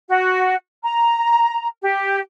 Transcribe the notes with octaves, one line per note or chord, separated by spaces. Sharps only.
F#4
A#5
G4